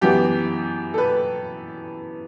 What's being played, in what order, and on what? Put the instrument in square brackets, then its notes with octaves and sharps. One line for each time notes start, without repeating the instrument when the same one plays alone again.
[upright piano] F#2 E3 B3 G4
A4
B4